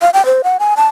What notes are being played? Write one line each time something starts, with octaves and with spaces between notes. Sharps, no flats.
F5
G5
C5
F#5
G#5
A5